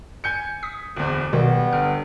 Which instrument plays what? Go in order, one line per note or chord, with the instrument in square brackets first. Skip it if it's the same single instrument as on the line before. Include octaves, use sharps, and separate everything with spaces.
[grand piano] G#5 G6 C#7
[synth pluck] D#6 B6
[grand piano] D1 E2
[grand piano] B1 [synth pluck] B2 D#3 [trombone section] G3 B3
[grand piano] G1 [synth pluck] F6